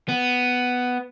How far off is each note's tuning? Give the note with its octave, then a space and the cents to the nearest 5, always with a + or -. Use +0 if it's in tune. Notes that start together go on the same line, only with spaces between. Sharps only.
B3 +5